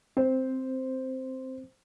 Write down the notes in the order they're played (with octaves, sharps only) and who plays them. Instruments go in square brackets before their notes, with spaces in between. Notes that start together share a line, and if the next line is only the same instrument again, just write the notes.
[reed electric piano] C4 [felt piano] C5